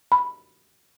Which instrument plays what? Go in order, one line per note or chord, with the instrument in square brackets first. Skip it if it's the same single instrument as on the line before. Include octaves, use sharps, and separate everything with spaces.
[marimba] B5